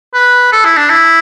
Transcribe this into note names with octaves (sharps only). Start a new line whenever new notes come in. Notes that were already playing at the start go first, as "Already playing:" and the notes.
B4
A4
E4
D4
E4